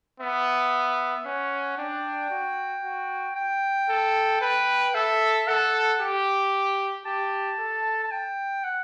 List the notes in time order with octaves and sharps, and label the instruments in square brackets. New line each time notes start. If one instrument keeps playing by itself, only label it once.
[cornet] B3 [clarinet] E5
[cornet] C#4 [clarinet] F#5
[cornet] D4 [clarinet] G5
[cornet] F#4
F#4
[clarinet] G5
[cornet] A4
[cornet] B4 [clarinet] G5
[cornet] A4 [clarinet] E5
[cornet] A4 [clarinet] F#5
[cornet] G4
[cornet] G4 [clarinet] A5
[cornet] A4
[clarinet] A5
G5
F#5